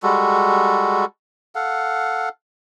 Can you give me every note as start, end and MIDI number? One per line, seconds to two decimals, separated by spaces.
0.03 1.05 55
0.03 1.05 56
0.03 1.05 66
0.03 1.05 69
1.55 2.29 69
1.55 2.29 77
1.55 2.29 78